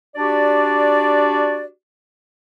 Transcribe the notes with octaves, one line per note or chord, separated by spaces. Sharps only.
D4 F#4 G4 D5